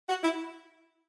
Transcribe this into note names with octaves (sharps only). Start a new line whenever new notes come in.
F#4
E4